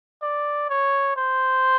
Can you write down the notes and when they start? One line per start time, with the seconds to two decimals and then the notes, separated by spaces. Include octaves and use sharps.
0.22 D5
0.69 C#5
1.16 C5